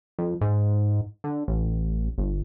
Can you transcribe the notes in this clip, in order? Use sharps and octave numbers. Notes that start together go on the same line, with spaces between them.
F2
G#2
D3
A1
G1